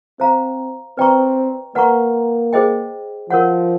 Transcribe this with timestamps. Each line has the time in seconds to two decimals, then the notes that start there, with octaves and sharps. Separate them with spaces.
0.20 C4 C5 F5 A#5
0.98 C4 B4 D5 G5 A#5 C#6
1.75 A#3 B4 D5 F#5 A#5 C#6
2.53 G#4 C5 D#5 G5
3.30 F3 A#4 C#5 F#5